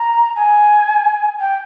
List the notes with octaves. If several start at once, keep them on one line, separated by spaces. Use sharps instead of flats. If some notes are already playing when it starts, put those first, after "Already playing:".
Already playing: A#5
G#5
G5